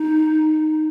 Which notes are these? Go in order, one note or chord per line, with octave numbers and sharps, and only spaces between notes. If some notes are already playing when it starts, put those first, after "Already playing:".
Already playing: D#4